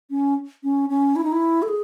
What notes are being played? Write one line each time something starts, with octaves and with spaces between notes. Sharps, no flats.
C#4
C#4
C#4
E4
D#4
E4
A4
G#4